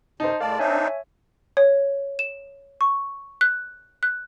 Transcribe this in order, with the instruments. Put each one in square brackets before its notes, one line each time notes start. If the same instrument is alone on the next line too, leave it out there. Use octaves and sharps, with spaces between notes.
[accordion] F#2 C3 [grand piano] D#4 C5 [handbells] A5
[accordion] A2 G#3 D5 [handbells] A#4 A5 [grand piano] F5
[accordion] C4 D4 D#4 [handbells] C#5 E5 G#5
[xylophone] C#5
E7
C#6
F#6
F#6